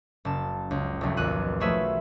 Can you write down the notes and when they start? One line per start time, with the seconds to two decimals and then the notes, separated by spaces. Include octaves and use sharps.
0.25 F#1 A5
0.71 C#2
1.01 F1 B1
1.17 G#1 D#2 F#6 D#7
1.60 F3 F#3 A3 G#4 B4 E5